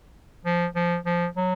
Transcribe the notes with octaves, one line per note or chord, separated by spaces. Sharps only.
F3
F3
F3
F#3